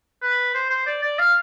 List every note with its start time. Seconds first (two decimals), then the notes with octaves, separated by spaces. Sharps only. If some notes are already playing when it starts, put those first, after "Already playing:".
0.22 B4
0.54 C5
0.70 C5
0.87 D5
1.03 D5
1.19 F5